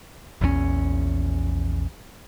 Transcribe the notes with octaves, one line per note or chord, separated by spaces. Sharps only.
A#1 E2 D#3 C#4